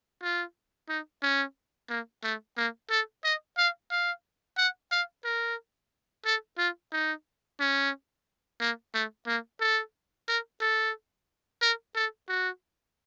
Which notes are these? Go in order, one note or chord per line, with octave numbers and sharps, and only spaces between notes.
F4
D#4
C#4
A#3
A3
A#3
A4
D#5
F5
F5
F#5
F5
A#4
A4
F4
D#4
C#4
A#3
A3
A#3
A4
A#4
A4
A#4
A4
F#4